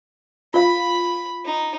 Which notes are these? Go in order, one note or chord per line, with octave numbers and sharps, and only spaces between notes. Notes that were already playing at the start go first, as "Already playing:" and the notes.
F4 F5 B5
D#4